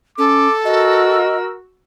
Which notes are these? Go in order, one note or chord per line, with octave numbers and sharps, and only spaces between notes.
C#4 A4 D6
F#4 A#4 D#5 E6